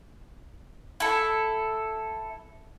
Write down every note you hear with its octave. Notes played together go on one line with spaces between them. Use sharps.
E4 A4